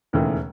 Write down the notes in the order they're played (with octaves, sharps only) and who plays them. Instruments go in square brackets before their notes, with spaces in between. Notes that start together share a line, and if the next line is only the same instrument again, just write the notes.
[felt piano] E1 D#2 C#3 E3 A3